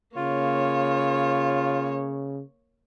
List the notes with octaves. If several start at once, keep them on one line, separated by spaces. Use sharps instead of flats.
C#3 A#3 F4 C#5